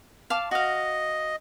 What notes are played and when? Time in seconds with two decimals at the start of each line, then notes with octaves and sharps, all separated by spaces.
0.30 F5 A5 D6
0.51 F#4 D#5 F5